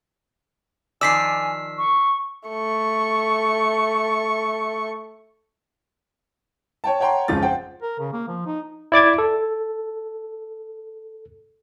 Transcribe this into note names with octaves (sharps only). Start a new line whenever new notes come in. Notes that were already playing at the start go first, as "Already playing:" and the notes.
D#3 F3 D5 G#5 E6 B6 C7
C#6
A3 C#6
C#5 G5 A5
C#5 F#5 G5 A#5 C6
G#1 F2 C#3 F4 A6
C5 F#5 G5
A#4
C#3
A#3
F3
D#4
E4 D5 D6 G#6
A4